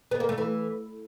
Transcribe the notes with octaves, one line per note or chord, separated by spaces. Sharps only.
B3
A#3
A3
E3